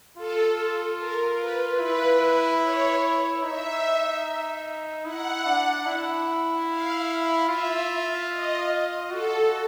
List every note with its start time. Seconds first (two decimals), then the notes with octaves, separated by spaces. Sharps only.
0.17 F4 A4
0.98 A#4
1.39 B4
1.80 E4 B4
2.61 C#5
3.43 D#4 E5
5.05 E4 F#5
5.46 D4
5.86 E4
6.68 F5
7.48 F4 E5
8.30 D#5
9.10 F#4 A4